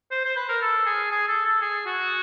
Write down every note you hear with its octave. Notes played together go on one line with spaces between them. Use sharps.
C5
C5
B4
A#4
A4
G#4
G#4
A4
A4
G#4
F#4